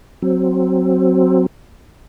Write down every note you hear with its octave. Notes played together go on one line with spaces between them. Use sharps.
F#3 C4